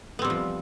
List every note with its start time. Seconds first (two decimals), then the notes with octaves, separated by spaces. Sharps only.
0.19 B3
0.22 C4
0.24 G3
0.27 C3
0.30 F3